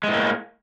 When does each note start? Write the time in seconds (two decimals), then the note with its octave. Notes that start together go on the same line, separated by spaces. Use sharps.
0.03 G#3
0.08 A2
0.13 A#3